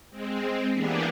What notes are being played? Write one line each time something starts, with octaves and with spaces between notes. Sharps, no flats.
G#3 C4
E3 A#3 B3 D4 G4 G#4